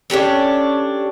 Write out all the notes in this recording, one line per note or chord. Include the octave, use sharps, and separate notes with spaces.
C#4 D4 G4 A4